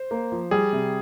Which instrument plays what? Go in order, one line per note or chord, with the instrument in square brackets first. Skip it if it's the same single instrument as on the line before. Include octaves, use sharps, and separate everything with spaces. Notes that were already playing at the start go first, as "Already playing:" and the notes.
Already playing: [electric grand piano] C5
[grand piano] A#3
F3
[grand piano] G3 [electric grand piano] G#4
[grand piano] C3